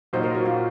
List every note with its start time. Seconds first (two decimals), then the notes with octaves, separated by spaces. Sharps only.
0.13 A#2 F#3 A#3 D#4 C5
0.23 A#4
0.35 F#4
0.46 F4